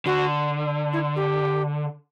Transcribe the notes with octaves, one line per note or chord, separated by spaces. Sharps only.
D3 F#4
E4
G4